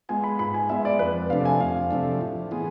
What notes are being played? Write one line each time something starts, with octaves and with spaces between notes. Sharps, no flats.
G#3 B3 F4 G#5
B5
G#2 B5
G#5
G#3 B3 F4 E5
D5
F2 B4
C3 F3 A3 D4 F5
G#5
F2 F5
C3 F3 A3 D4
A2
E3 B3 F4 G#4